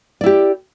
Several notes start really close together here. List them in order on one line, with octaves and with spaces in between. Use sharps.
D5 E4 G4